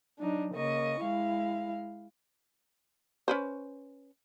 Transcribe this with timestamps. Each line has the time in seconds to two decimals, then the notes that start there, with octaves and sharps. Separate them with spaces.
0.19 F#3 D4 D#4
0.54 C#3 A#3 D#5 C#6
1.03 G#3 E4 F5
3.28 C#4 B4 C5